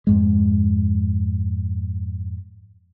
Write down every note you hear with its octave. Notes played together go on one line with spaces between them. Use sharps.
F2 G#2 G#3